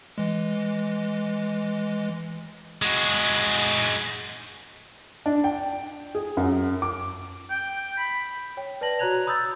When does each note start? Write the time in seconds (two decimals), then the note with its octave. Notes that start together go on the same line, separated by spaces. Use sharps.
0.18 E3 G#3
2.82 G#3 F#4
5.26 D4
5.44 G5
6.15 G#4
6.37 F#2
6.82 D6
7.50 G5
7.98 B5
8.57 C#5 G5
8.81 B4 D5 A5 A#6 F#7
8.99 F#4 C#5 A#5 F#6 G#6 F7
9.26 A#5 B5 D#6 E6 G6 A6